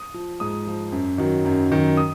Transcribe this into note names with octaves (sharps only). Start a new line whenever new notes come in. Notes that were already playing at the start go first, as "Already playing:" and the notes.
Already playing: D#6
F3
G#2 D#6
F3
F#2
D#3 F#3
F#2
D#3 F#3
D#6